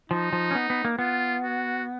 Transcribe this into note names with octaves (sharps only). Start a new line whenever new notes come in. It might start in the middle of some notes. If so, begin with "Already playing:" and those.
F3 D#4
F3
C#4
B3
B3
A#3
B3 F4
F#4